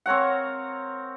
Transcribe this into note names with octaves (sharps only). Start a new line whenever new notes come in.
C4 A#4 C#5 F#5